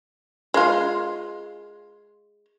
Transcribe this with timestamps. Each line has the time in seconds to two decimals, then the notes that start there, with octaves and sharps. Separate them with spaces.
0.54 G#3 F4